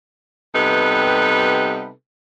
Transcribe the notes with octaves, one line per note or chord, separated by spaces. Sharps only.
C3 G3 B3 D#4 A4 B4